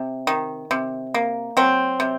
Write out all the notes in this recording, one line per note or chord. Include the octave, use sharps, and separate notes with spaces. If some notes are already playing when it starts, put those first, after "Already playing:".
Already playing: C3
D#3
C3
A#3
F#3 C4
C3